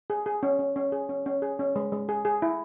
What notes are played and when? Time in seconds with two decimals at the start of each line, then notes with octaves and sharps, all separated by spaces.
0.10 G#4
0.26 G#4
0.43 C#4
0.59 C#4
0.76 C#4
0.92 G#4
1.09 C#4
1.26 C#4
1.42 G#4
1.59 C#4
1.76 G#3
1.92 G#3
2.09 G#4
2.25 G#4
2.42 E4